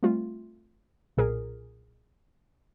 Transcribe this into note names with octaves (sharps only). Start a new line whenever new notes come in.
G3 A3 C4 F4
B1 A#2 G#4 A#4